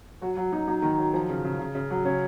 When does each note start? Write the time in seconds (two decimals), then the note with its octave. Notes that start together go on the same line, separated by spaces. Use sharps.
0.21 F#3 F#4
0.37 F#3 F#4
0.52 F#3 D#4
0.67 F#3 D#4
0.82 D#3
0.98 F#3
1.14 F3
1.29 C#3
1.44 C#3
1.59 C#3
1.75 C#3
1.90 F#3
2.05 C#3 C#4